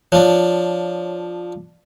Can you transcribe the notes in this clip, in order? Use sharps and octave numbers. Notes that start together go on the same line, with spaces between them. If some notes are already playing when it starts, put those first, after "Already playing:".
F3 D4 C#5